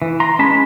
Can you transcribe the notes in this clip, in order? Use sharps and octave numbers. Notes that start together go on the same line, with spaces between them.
E3
A#5 C6
G#3 C#4 A5 B5